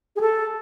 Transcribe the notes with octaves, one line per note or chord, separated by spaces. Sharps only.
G#4
A4